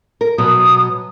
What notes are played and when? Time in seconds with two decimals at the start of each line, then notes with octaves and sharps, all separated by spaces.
0.21 A#4
0.38 B2 F#3 D#6